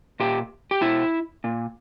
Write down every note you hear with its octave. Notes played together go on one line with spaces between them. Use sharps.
A#2 G4
G4
B2 E4
A#2